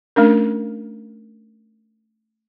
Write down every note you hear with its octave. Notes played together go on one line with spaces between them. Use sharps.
A3 C#4 D4 A#4